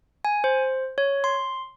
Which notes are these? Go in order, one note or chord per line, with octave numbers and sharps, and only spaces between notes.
G#5
C5
C#5
C6